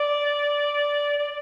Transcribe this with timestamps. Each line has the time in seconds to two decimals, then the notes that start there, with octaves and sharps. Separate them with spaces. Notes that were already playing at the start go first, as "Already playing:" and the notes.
Already playing: D5
1.19 D5